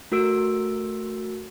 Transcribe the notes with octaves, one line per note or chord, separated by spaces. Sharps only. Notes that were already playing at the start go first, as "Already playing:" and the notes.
A3 F#4 A#4 E6 D7